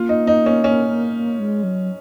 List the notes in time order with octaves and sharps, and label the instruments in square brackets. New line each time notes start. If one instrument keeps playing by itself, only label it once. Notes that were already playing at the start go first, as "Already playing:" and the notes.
Already playing: [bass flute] A#3 [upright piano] F4
[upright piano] D#4
D#4
C#4
C#4
[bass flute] G#3
F#3